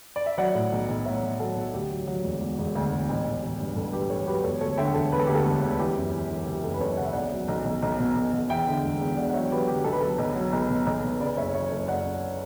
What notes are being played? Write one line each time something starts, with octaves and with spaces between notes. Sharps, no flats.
D5
E5
F#3 D5 F#5
A2
B1
B1
A2 C#5 E5
B1
F#3 A4
B1
D2 G4
F#3
F#3
E1
E1
E1
D2
E1
A1
A1
A1
G2
G2 A4
A1 G4 B4
A1 A4 C#5
F#3 G4 B4
E1 A4 C#5
D2 A4 C#5
D3 E5 G5
E1 A4
E1 B4
A4
D2 G4
A4
E1
D2
E3 G4
F#2
E3
E3
C#3 G4
F#1 A4
B4
F#1 A4 C#5
C#3 F#5
E5
B1 D5 F#5
F#3
B1
B1
B1
B2
B1
B1
E2 E5 G5
D3
E1
E2
D3 D5 F#5
F#5
F#3 C#5 E5
F#3 G4 B4
D3 G4
B1 A4
B4
F#3 A4
B1
F#3
B1
B2
B1
B1
C#3 B4 D5
F#1 C#5 E5
F#3 C#5 E5
F#1 A4 C#5
F#1 D5 F#5
F#2